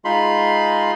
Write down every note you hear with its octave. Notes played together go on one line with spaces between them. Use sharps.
G#3 D#4 F4 B5 C6